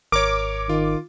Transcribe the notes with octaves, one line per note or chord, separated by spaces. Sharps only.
G#1 A#4 C#5 D6
D#3 F4